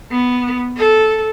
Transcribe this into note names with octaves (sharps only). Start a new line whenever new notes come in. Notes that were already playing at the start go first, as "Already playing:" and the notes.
B3
A4